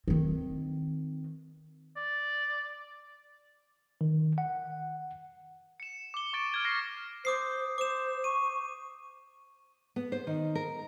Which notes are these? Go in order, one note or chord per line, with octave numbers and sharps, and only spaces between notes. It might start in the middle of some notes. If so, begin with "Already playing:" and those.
D#3 C4
D5
D#3
F#5
C#7 E7
D6 G7
C#6 A6 D7
F6 G#6 D7
D6 F6 G#6 A#6 C7 E7
C5 D6 D#6 C7
C5 D6 E7
C#6 D#7
B3
C5
D#3
A#4